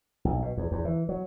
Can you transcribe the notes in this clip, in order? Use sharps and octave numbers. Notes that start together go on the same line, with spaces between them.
B1
B2
E2
E2
E3
F#3